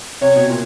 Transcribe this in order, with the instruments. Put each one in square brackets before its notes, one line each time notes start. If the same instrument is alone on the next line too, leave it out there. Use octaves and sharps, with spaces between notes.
[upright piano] C3 [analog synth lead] C#5
[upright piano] B2
A#2